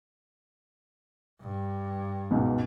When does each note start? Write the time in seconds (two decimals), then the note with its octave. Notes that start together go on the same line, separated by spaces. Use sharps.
1.42 G2
2.31 C#2 G#2 B2